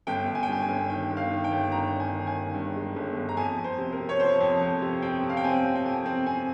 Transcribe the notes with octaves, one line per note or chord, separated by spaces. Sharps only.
G1 G5
G1
G#5
G5
G2 G#5
G#5
G1
D#3 G5
G1
F5
D#3
G5
G1
G2 A#5
G2
G#5
D#3
G#5
D#3
G2
G#3
G1
G1
A#5
F2 G#5
F2
C5
C3
A#4
C3
C#5
F3 C5
F2
F2
C3
C4 G5
C3
F5
G5
C4 G#5
C3
G5
F2 G#5
C4
C4 G#5